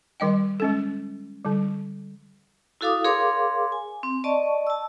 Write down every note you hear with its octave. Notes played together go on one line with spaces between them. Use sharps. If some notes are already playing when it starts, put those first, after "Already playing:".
D#3 G3 D#5 G5
G#3 C#4 A4
D3 G3
E4 F#4 A4 F5 D6 D#6
G#4 A#4 C#5 F5 C6 D6
G#5
C4
D5 D#5 A5 C#6
A5 E6